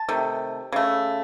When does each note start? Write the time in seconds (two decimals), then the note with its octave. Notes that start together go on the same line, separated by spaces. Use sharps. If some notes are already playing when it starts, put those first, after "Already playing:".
Already playing: A5
0.09 C3 D#3 A3
0.72 C#3 A3